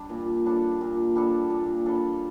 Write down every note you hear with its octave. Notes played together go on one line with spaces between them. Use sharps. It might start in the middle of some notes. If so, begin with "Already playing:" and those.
Already playing: G3 D4
A#2
G3 D4 A4
A#2
G3 D4 A4
A#2
G3 D4 A4